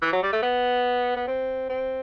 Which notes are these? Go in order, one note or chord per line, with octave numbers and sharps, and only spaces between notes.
E3
F#3
G3
A3
B3
B3
C4
C4